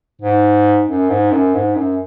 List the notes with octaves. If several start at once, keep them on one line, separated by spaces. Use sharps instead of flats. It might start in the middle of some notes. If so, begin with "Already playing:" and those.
G#2
F#2
G#2
F#2
G#2
F#2